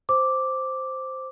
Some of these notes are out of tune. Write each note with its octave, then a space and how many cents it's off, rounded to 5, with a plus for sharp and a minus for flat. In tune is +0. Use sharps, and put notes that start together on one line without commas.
C5 +0 D6 +0